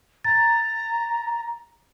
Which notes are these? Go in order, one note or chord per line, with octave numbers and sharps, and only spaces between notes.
A#5 A6